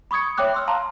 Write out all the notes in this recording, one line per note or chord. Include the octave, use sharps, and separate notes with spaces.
B5 C#6 D#6 G#6 C#7
C#5 E5 G5 D6 F#6
C6 E6 F6
F5 A5 A#5 C6